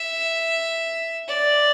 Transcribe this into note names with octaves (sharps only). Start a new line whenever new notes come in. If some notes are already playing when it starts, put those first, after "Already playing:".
Already playing: E5
D5